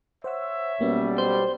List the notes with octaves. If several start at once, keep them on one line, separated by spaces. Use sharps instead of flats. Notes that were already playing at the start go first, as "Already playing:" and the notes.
C5 C#5 E5 F#5 E6
B1 B2 G3 A#3 B3 C#4
C5